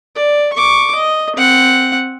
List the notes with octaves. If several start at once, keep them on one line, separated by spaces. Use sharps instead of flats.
D5
C#6 D6
D#5
C4 F#5